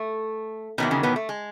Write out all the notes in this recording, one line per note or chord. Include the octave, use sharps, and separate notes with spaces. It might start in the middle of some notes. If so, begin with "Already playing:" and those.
Already playing: A3
E2 B2 D#3 F#3 B3
C#3 C#4
B2 B3
A3
G#3